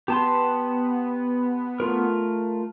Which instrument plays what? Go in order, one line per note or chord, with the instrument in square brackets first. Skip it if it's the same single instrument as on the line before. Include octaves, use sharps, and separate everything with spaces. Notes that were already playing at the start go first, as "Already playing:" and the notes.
[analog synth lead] B3 [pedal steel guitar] G4 A5 C6
[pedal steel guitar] A3 F4 A#4